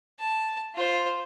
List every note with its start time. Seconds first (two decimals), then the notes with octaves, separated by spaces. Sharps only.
0.19 A5
0.75 F4 C5